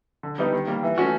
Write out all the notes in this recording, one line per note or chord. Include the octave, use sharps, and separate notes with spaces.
D3
G3 B3 D#4 G4
D#3
G3 A#3
E3
A3 C#4 F#4